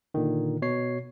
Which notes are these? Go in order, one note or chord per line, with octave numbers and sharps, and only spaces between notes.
A#2 D3 D#3
B2 C#5 C7